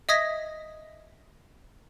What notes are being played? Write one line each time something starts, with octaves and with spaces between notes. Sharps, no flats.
D#5 E5 D#6 G#6 A#6 B6